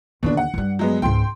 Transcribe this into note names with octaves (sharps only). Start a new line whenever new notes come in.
D#2 B2 D3 D4
F#5
G2 G3
F#3 G#3 B3
C#2 G#2 G5 C6